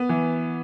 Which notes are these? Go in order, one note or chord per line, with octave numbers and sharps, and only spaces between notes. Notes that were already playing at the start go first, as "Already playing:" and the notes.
Already playing: B3
E3